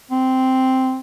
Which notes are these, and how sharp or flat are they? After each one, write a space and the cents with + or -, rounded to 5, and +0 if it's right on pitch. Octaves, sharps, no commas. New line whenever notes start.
C4 -5